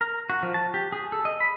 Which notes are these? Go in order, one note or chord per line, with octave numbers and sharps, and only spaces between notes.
A#4
F#4
F3
A5
G4
G#4
A4
D#5
B5